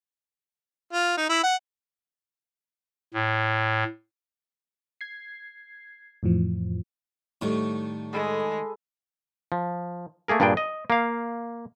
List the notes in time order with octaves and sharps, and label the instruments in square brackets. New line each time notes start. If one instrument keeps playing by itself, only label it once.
[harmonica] F4
D#4
E4
F#5
[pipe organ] A2
[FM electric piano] G#6 C7
F2 A2 E3 F3
[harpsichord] A2 [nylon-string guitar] D#3 G3 A3 [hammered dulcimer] C#6
[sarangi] G#3 [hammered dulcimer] G#4 A4 B4
[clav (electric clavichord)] F3
A3 A#3 G#4 A#4
G2 A#2 D4 G#4 G5
D#5
A#3 F5